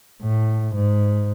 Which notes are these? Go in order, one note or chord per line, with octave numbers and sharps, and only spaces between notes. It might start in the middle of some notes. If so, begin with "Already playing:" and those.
A2
G#2